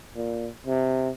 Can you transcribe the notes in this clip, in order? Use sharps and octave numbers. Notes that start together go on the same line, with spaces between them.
A#2
C3